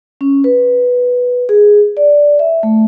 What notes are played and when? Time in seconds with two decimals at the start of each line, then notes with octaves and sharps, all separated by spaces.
0.21 C#4
0.44 B4
1.49 G#4
1.97 D5
2.39 E5
2.63 A3